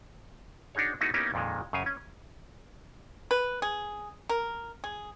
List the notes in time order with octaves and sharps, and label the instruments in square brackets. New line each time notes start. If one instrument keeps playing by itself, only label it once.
[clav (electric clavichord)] D4 D#4 F#4 G#4 C#5
A3 B3 D#4 E4 F#4 G#4
A#3 B3 C#4 D#4 E4 G4
F2 A#2 D#3 G#3
F#2 C#3 F5 G#5
C#4
[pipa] B4
G#4
A#4
G#4